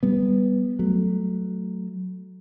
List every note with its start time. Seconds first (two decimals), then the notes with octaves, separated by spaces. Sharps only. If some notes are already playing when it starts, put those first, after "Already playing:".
0.03 G3 B3
0.79 F#3 A3